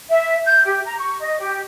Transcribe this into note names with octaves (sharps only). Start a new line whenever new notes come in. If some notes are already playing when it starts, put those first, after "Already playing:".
E5
G6
G4
A#5
C#6
D#5
G4